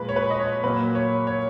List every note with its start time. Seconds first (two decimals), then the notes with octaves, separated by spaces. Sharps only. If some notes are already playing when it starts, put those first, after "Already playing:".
Already playing: A#2 F3 G#3 B4
0.09 C#5
0.16 B4
0.30 D#5
0.40 C#5
0.64 A#2 F#3 A#3 B4
0.95 C#5
1.27 C#5